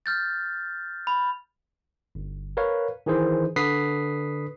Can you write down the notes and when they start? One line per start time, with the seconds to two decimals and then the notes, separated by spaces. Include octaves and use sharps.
0.06 F6 G6 A6
1.07 B5
2.15 G1
2.57 A#4 B4 C#5 F5
3.06 D#3 E3 G#4 C5
3.56 D3 B4 D#6 B6 C7